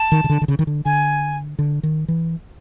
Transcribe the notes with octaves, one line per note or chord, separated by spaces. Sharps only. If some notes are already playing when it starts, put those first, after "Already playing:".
Already playing: A5
D#3
C#3
D3
D3
C#3
D#3
D3
D3 G#5
D3
D#3
E3